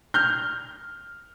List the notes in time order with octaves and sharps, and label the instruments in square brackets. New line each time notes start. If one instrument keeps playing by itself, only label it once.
[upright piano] F6 G6